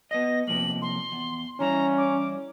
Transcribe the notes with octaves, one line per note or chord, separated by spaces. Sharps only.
B3 D#5 A#6
C3 F3 A#3 F#7
C6
E2
E3 G3 C#4 E4 A#5
D6